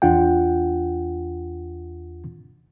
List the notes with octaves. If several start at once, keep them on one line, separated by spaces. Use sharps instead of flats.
E2 D4 F4 F#5 G5